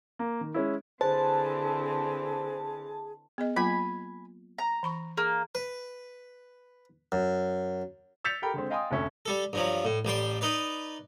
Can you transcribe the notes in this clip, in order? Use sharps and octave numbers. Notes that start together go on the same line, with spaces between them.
A#3
D#3
G#3 C#4 E4
D3 E3 C4 G#4 C5 A5
B3 G#4 D#5
F#3 A#3 F4 G#5 B5
A#5
E3 B5 C#6
A#3 G#4
B4
F#2
E6 G6 A6 B6 C#7 F7
G4 A4 A#4 G5 B5
D3 G#3 C4
D#5 F5 G5 G#5 C6 D#6
F1 D2 A3 C#4 E5
G3 A4
G2 F3 F#3
A2
A1 G3 G5 C6
D#4 B4 D5